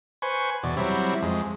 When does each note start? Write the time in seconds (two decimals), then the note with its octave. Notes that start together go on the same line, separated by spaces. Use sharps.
0.22 B4 C5 G#5 C#6
0.63 E2 B2 D5
0.77 F#3 G3 C4 E4
1.22 F2 G#3